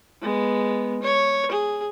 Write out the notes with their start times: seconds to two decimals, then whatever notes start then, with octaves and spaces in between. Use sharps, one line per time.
0.22 G#3 B3
1.02 C#5
1.51 G#4